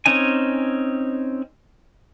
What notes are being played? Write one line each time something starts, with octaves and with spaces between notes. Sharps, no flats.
C4 C#4 D#4 G#5